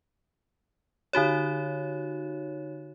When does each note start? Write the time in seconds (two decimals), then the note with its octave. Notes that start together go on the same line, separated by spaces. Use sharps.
1.13 D3 D#4 F#4 C#5